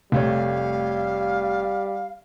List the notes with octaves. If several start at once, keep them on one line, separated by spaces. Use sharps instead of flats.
F1 G3 A3 C#5 F5